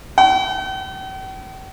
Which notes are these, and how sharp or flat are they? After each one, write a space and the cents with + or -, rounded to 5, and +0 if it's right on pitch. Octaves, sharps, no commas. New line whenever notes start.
G5 -45